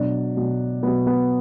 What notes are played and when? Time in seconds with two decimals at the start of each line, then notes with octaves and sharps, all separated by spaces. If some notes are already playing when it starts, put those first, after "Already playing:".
Already playing: B2 F#3 D4
0.37 B2 F#3
0.83 B2 F#3 B3
1.07 B3